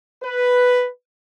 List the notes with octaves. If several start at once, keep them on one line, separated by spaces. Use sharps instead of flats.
B4